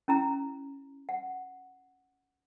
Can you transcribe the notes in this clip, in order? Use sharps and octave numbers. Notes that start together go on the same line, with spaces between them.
C#4 E4 A#5
F#5